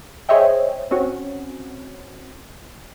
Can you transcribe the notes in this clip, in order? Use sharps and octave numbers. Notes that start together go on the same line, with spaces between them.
G#4 C5 C#5 D#5 E5 G5
C4 C#4 F#4